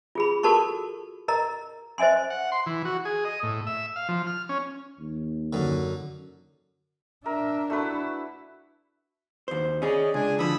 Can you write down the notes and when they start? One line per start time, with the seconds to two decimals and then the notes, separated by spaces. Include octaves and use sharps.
0.15 F4 G#4 B5
0.43 F#4 A4 A#4 A5 B5 C#6
1.28 A#4 D#5 A#5
1.98 C5 D#5 E5 G#5 C6
2.30 F#5
2.52 C6
2.66 E3
2.85 F#4
3.05 G#4
3.25 D#5
3.43 A2
3.67 E5
3.96 F5
4.09 F3
4.27 F6
4.49 C#4
5.00 D#2
5.53 F#2 D3
7.26 D4 A#4 E5
7.70 A3 E4 F#4 B4
9.48 D#2 C5
9.82 C#4 G#4 D5 D#5
10.14 C#2 D4 G#4 G#5
10.39 D3 E3 F3 B5 D#6 E6